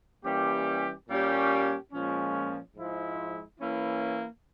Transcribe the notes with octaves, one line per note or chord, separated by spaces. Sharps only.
E3 G3 A#3 C#4 G4
A#2 G3 A#3 C#4 G4
A#2 F3 G#3 C#4
G#2 F3 G#3 E4
E3 A#3 C#4 E4